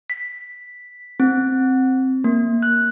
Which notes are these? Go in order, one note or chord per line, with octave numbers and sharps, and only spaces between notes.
B6
C4
A#3
F#6